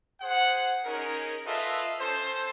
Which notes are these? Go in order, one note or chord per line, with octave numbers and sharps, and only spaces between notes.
G#4 C5 F#5
C#4 D#4 G#4 A#4
F4 A4 B4 D#5 E5
C#4 A4 C5